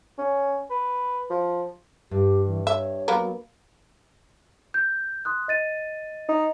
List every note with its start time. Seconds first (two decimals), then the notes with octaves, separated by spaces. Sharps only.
0.18 C#4
0.70 B4
1.30 F3
2.11 G2 G4
2.46 E3
2.67 C#5 E5
3.08 F#3 A#3 B3 A#4
4.74 G6
5.25 C6 D#6 F#6
5.48 D#5 A6 D#7
6.29 D#4